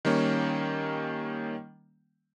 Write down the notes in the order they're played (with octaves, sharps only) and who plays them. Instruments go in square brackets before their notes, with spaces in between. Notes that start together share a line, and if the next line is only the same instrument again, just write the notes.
[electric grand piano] D#3 G3 A#3 C#4